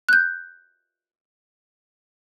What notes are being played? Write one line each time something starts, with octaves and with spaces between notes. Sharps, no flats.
F#6 G6